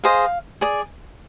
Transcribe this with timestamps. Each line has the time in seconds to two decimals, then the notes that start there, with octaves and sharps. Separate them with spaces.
0.04 G#4 C5 D#5 F5
0.61 G#4 D5